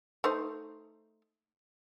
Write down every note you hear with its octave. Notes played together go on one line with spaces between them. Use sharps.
A3 D#4 C5